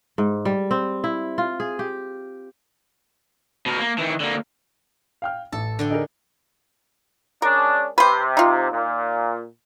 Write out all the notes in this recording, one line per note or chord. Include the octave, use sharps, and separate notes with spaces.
G#2
G3
C4
E4
F4
G#4
G4
B2 A#4
A#3
D#3 E3
D3 A#3
F5 G5 F6
A1 A4
D3 D5 G5
D#4 G#4 A#4
G#3 C#4 D4 A#4
C3 B4 C5
D#4 F4
A#2